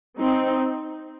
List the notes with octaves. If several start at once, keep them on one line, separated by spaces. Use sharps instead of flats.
C4 D#4